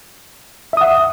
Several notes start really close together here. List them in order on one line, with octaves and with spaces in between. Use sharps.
E5 D#6 F#5